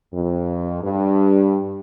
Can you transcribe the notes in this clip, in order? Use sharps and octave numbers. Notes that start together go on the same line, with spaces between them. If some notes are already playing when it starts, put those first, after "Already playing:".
F2
G2